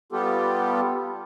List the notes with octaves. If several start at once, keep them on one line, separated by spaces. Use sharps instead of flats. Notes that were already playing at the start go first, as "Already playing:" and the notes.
G3 B3 F4 G4 A4